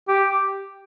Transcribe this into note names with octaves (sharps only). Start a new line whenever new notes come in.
G4